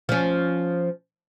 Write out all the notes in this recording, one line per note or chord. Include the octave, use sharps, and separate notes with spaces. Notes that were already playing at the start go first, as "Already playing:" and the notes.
F3 C#4